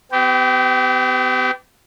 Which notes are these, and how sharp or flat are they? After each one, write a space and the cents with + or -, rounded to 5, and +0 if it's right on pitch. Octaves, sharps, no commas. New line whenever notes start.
B3 +40 G4 -20